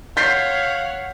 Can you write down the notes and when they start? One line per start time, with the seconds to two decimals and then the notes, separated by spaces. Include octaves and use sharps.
0.17 C#5 F5 F#5 G6 B6 C7